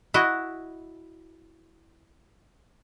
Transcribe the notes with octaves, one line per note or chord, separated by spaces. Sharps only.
E4 F#4 D#5